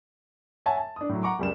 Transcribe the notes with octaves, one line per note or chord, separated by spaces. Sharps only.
C#5 E5 F#5 G#5 A5
A5
D4 D#6
A2 F#3
F#5 A#5 C#6 D6
C#2 F#2 G3 G#4 E7